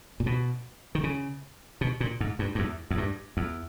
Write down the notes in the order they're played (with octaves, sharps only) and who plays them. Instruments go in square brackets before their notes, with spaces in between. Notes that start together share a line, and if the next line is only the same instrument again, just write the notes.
[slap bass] A#2
B2
D#3
C#3
B2
A#2
G#2
G2
G2
E2
E2
G2
E2